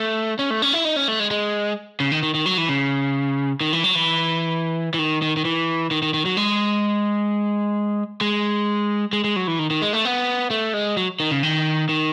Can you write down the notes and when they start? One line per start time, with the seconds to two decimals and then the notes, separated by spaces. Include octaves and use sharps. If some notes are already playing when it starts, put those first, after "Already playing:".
Already playing: A3
0.39 C#4
0.50 A3
0.62 C#4
0.73 E4
0.85 D#4
0.96 C#4
1.08 A3
1.20 G#3
1.31 G#3
2.00 C#3
2.12 D#3
2.23 D#3
2.34 D#3
2.46 F#3
2.58 E3
2.69 C#3
3.61 D#3
3.73 E3
3.84 F#3
3.95 E3
4.94 E3
4.99 D#3
5.22 D#3
5.37 D#3
5.45 E3
5.91 D#3
6.02 D#3
6.14 D#3
6.25 F#3
6.37 G#3
8.21 G#3
9.13 G#3
9.24 G#3
9.36 F#3
9.47 E3
9.59 D#3
9.70 D#3
9.82 G#3
9.93 A3
10.05 B3
10.50 A3
10.74 G#3
10.97 F#3
11.20 D#3
11.31 C#3
11.43 D#3
11.89 D#3